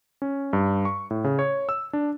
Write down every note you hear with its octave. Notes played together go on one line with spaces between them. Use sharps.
C#4
G2
C#6
A2
C#3
C#5
E6
D4